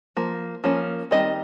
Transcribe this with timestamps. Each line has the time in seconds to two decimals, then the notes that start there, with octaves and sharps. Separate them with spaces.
0.17 F3 A#3
0.64 F3 A#3 C#4
1.11 D#3 G3 C4 D#5